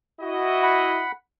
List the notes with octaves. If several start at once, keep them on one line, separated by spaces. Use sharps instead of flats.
E4 F#4 D#5
F#5 B5